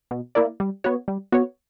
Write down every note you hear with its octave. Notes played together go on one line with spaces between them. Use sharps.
B2
A#3 E4 A#4 D5
G3
B3 F#4 C#5
G3
B3 F#4 C#5